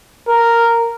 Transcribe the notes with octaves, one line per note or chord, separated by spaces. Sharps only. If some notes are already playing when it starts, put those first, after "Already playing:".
A#4